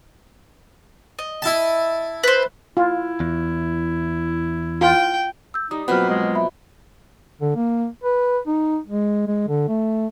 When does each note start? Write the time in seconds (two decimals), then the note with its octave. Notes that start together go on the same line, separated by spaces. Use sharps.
1.19 D#5
1.42 E4 A5
2.24 B4 C5
2.77 E4 F4
3.20 E2
4.81 F4 G5
5.54 E6 G6
5.71 G3 D#4 D#6
5.88 B2 F3 F#3 A#3 C4 B4 F#5 F6
6.10 G#3
6.35 E5 B5
7.41 D3
7.56 A#3
8.03 B4
8.47 D#4
8.87 G#3
9.27 G#3
9.48 D3
9.68 A3